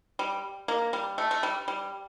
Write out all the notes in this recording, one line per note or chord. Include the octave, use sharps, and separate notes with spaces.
G3
A#3
G3
A3
A3
G3
G3